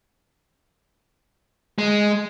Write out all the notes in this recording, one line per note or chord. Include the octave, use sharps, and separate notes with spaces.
G#3